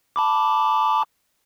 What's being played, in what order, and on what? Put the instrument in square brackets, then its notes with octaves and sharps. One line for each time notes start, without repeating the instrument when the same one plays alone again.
[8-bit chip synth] A5 B5 D6